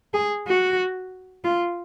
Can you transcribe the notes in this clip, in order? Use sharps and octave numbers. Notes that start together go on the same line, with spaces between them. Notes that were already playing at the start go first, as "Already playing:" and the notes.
G#4
F#4
F4